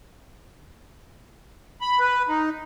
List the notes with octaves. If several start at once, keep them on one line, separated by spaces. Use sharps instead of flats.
B5
B4
D#4